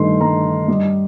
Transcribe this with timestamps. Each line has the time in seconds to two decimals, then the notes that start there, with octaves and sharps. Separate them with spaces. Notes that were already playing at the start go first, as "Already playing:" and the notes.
Already playing: G2 D#3 A3 C6
0.21 G2 A#5
0.68 G3 D#5